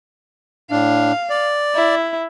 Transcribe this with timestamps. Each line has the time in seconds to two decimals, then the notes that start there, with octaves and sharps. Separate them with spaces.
0.71 A2 D4 F5
1.30 D5
1.75 E4